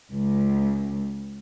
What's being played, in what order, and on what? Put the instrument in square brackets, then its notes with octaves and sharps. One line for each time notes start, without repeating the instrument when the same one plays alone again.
[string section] C#2